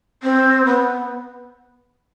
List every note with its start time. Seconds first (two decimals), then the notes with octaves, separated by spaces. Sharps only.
0.23 C4
0.66 B3